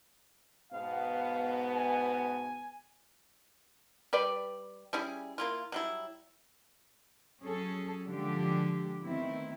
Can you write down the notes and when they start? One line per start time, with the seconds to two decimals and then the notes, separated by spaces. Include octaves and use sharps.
0.73 G#2 B2 B3 F5
1.75 G#5
4.13 G3 B4 D5
4.93 G3 C#4 E4 G#4
5.38 A#3 E4 F4
5.72 F#3 G3 E4
7.41 F#3 C#4 G#4 A4
8.06 D3 F3 G#3 D4 G4
9.04 D#3 A3 B3 C4 E4